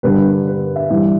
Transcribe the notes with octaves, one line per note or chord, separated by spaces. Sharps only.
G2 D3 G3 B4
B4
E5
G2 E3 G3 E5